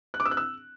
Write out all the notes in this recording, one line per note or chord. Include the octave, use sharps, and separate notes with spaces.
F#6
D6
E6
F#6
E6